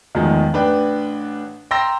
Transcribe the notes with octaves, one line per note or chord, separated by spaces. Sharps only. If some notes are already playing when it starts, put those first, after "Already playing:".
E2 A2 D#3 F3 G#3
A1 D4 B4 G5
G5 A#5 C6 E6 A#6